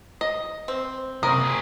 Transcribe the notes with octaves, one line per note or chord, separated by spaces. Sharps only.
D#5
C4
F#1 C3 A#4 D#6
G4 G#4